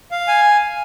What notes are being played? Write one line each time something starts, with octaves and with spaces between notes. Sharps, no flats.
F5
G#5